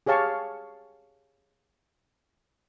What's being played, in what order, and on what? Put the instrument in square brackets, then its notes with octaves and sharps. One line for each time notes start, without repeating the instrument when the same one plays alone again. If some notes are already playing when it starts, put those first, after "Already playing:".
[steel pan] G4 G#4 C#5 F5 A5 C#6